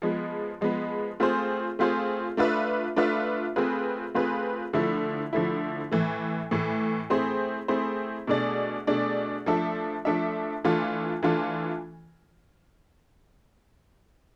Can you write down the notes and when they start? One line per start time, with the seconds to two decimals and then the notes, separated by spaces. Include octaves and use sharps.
0.02 F3 G#3 B3
0.61 F3 G#3 B3
1.20 A3 C4 F4 G#4 C5
1.79 A3 C4 F4 G#4 C5
2.37 A3 D4 F4 B4 E5
2.96 A3 D4 F4 B4 E5
3.56 A3 C4 F4 G#4 B4
4.14 A3 C4 F4 G#4 B4
4.73 D3 F3 A3 E4
5.33 D3 F3 A3 E4
5.92 A2 E3 A3
6.51 A2 E3 A3
7.10 A3 C4 E4 G#4 C5
7.68 A3 C4 E4 G#4 C5
8.27 B2 A3 D4 G#4 D5
8.87 B2 A3 D4 G#4 D5
9.46 F3 A3 D4 A4 E5
10.05 F3 A3 D4 A4 E5
10.64 E3 A3 D4 F4 A4
11.23 E3 A3 D4 F4 A4